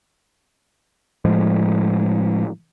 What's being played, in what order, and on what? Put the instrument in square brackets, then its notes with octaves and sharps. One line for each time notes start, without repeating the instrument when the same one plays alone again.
[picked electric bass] A2 F3 G#3